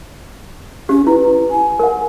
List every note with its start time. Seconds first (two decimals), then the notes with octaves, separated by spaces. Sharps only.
0.89 C#4 G4
1.07 E4 B4
1.50 G#5
1.79 A#4 F#5